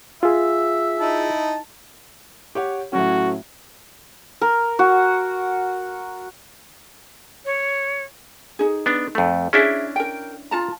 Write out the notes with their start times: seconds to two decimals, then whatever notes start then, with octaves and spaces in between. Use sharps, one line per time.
0.23 F4 G#4 E5
0.98 D#4 E4 A5
2.55 G4 C#5 F#5
2.93 A2 F#3 C#4 F#4
4.41 A#4
4.79 F#4
7.44 C#5
8.59 D#4 G#4
8.86 B3 D4
9.15 F2 A3
9.53 C#4 D4 E4 G#4 E5
9.96 A#4 G5
10.51 F4 A5 A#5